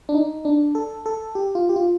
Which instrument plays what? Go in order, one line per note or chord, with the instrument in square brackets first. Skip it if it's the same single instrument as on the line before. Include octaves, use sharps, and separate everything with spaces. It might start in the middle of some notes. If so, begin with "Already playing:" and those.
[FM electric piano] D4
D#4
D4
A4
A4
G4
F4
G4
F4